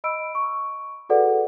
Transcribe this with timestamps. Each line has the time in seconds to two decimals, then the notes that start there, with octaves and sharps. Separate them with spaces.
0.04 D#5 B5 E6 D7
0.35 C#6
1.09 F#4 G#4 A4 B4 D5 F#5